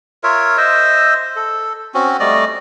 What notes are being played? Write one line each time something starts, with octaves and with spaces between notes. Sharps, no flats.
F4 A#4 C#5 E5
C5 D#5 E5 E6
A4
C4 C#4 F#4
G3 A3 D5 D#5